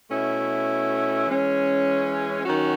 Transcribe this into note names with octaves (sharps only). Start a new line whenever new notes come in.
B2 A3 C#4 E4
E3 G#3 C#4
D#3 F#3 C#4 F#4